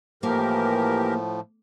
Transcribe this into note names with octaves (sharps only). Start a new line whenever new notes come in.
A2 E3 F3 A#3 G4 A#4